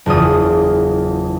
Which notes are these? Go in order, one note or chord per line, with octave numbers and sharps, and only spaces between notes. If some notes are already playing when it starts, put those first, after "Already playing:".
F#1 E2 F4 D#6